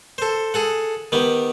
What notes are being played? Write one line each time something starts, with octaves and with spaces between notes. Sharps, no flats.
A4 C5
G#4 A4 F#5
D#3 B3 G4